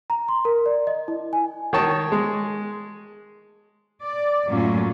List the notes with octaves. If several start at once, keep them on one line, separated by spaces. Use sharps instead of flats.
A#5
C6
A#4
D5
D#5
E4
G#5
D#3 C#5 A5
G#3
D5
F#2 A2 F#3 A#3 C#4 F4